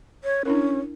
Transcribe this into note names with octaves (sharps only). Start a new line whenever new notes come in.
C#5
C#4 D4 E4 A#4